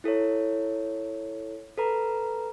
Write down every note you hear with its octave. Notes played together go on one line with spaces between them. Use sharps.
E4 A4 A#4 C#5
A4 B4 A#5